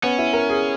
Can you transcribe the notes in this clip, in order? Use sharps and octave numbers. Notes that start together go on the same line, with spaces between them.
B3 C#4
E4
A#4
G#4